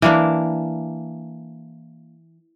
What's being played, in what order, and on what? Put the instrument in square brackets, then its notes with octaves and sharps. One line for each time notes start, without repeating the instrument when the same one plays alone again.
[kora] E3 A#3 D4